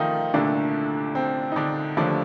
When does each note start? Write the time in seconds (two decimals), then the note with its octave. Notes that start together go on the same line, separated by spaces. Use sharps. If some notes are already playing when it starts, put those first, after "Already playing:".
Already playing: D#3 F3 A3 D#4 F4
0.34 C2 A#2 D3 A3 D4
1.15 C4
1.52 D#4
1.56 D3 D4
1.97 D#2 D3 F3 A3 D4